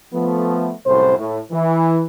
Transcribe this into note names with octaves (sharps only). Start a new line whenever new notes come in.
F3 A3 B3
C2 F#2 A2 C5
A2
E3